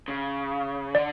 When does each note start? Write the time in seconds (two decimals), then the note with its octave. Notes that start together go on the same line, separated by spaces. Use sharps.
0.08 C#3
0.95 D3 D5